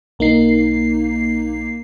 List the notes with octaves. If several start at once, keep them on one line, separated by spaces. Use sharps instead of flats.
B1 A#3 D#4 C7